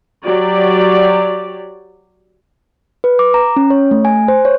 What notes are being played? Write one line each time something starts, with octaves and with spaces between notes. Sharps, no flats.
F#3 G4 D5
B4
D6
A#5
C#4
C#5
A3
G#5
C5
C#5